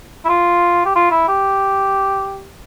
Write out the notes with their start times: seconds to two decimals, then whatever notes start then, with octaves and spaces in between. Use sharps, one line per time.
0.25 E4
0.29 F4
0.86 G4
0.96 F4
1.11 E4
1.28 G4